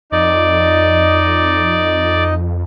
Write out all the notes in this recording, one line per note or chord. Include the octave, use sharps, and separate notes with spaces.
F2 D#4 D5 D#5